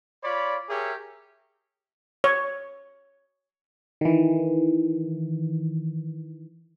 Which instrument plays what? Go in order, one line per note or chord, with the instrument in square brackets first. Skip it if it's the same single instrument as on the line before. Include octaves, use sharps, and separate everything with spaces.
[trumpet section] F4 C#5 D5 B5
G4 G#4 A#4 C#5 E5
[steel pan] C#5
[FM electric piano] D#3 E3